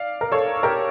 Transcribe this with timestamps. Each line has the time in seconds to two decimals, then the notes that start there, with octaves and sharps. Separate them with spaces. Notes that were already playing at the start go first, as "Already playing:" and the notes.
Already playing: D5 F5
0.21 A#4
0.32 A4 C#5
0.63 G4 A#4